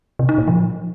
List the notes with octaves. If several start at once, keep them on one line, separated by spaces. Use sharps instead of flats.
C3
D#4
A#2
F3